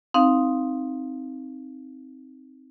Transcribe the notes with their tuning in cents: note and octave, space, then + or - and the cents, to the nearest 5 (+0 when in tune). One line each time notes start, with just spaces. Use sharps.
C4 +0 D#4 +0 F5 +0